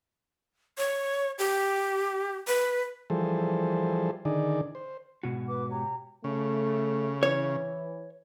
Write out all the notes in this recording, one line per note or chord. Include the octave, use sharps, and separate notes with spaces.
C#5
G4
B4
E3 F3 G3 G#4 A4 C5
D3 D#3 D#4 G#4 D5
C5
G#2 B2 F#4
B4 D6
G4 C#5 A#5
C#3 A3
E3 C#5